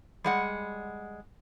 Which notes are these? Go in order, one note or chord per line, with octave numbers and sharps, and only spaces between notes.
G3 G#3 F#5